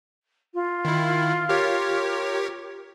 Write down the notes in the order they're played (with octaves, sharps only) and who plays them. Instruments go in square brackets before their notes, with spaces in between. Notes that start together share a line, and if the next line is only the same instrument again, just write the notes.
[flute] F4
[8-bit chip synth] D#3 E4
G4 A#4 C#5